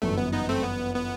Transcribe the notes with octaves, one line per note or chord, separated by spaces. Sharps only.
G1 F#2 E3 A3
B3
B3 D#4
A3 C4
B3
B3